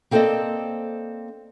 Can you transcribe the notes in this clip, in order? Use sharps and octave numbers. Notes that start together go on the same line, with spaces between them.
A#3 C4 A4 C5 D5 D#5